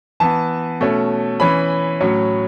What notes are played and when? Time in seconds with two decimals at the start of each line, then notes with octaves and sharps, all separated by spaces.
0.20 E3 B3 A5
0.81 B2 A3 C#4
1.40 E3 C#4 B5
2.01 A2 F#3 C#4